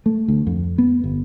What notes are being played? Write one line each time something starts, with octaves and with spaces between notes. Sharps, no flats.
A3
D2
F2
B3
G1